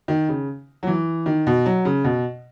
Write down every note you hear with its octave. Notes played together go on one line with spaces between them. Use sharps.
D#3
C#3
F#3
E3
D#3
B2
F#3
C#3
B2